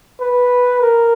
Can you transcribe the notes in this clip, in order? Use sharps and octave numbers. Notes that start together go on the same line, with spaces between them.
B4
A#4